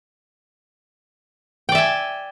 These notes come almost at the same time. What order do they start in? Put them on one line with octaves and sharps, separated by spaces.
G5 D5 E5 G#5